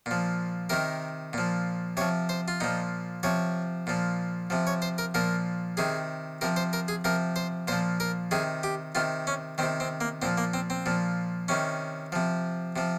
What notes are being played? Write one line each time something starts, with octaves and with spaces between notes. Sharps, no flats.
A#2 F3
C3 D#3 A#4
A#2 F3
C3 F3 C#5
C5
F4
A#2 F3 D#4
C3 F3 C#5
A#2 F3
C3 F3
C#5
C5
A#4
A#2 F3 A#4
C3 D#3 G#4
C3 F3 A#4
C5
A#4
G#4
C3 F3 A#4
C5
A#2 F3 C5
A#4
C3 D#3 G#4
G4
C3 D#3 F4
C#4
C3 D#3 C4
C4
A#3
A#2 F3 C4
A#3
C4
C4
A#2 F3
C3 D#3 C#4
C3 F3
C3 F3